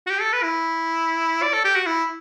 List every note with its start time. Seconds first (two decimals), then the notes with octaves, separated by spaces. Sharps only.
0.07 F#4
0.10 G4
0.21 A4
0.33 B4
0.43 E4
1.43 D5
1.54 A4
1.65 G4
1.75 F#4
1.86 E4